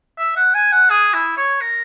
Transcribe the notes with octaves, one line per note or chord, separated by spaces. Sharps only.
E5
F#5
G#5
F#5
G#4
E4
C#5
A#4